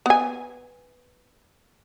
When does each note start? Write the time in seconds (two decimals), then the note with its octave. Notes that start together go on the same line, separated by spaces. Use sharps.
0.06 B3 G#5